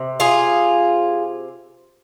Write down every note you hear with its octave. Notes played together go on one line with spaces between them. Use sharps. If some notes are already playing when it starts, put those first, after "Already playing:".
Already playing: C3
F4 G#4